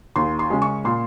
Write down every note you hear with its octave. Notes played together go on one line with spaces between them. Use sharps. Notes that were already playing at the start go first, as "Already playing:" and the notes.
D#2 C6
C6
C#3 G#3 C#4
C#6
A#2 C6